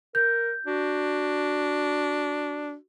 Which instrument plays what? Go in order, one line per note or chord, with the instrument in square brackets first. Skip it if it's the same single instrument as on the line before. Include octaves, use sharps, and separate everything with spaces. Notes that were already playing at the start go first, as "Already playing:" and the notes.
[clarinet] A#4 [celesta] G6
[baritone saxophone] D4 [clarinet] F#4